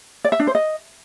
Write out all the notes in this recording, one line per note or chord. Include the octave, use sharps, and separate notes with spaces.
D5
E5
D4
C5
D#5